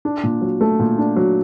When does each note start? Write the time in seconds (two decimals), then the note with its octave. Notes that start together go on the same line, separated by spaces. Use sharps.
0.05 D4
0.24 A#2
0.42 F#3
0.61 A3
0.79 A#2
0.98 D4
1.16 F#3